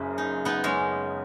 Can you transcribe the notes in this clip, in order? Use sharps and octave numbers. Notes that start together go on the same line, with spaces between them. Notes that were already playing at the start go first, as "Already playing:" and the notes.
Already playing: F#1 F#2 C#3 C#4
D#4
B3 D#4
G#3 C#4